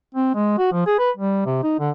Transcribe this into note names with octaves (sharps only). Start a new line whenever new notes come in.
C4
G#3
F#4
F3
G#4
B4
G3
C3
D#4
D3